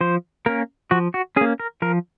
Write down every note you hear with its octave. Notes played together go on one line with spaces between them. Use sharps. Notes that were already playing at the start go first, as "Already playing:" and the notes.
F3 C5
A#3 C#4 A#4
F3 F#4
F#4
A#3 C#4 G#4
A#4
F3 A#4